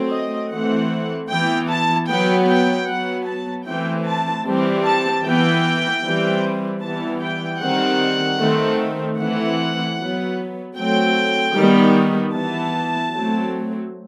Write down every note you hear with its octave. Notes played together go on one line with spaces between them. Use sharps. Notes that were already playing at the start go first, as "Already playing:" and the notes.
Already playing: F#3 A3 C4
D#5
E3 A3 C4 F#5
E3 B3 G5
A5
F#3 B3 G5
G5
F#3 B3 F#5
A5
E3 A3 C4 G5
A5
E3 G3 C4
A5
E3 B3 G5
E3 G3 C4
E3 G3 B3 A5
G5
D#3 G3 C4 F#5
D#3 A3 C4
E3 A3 C4 F#5
F#3 B3
F#3 A3 C4 G5
D#3 G3 B3
E3 B3 A5
F#3 A3 C4